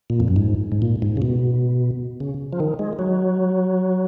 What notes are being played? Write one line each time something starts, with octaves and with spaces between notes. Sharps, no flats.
A#2
F2
F#2
G#2
G#2
A#2
G#2
C#3
B2
C#3
F3
D#3
G#3
F#3